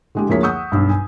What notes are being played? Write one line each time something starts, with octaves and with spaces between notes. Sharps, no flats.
D3 G#3 G4
D2 F3 A#3 G#4 C#5 B6
F#5 C#6 D#6 E6 G6
B1 G2
G#5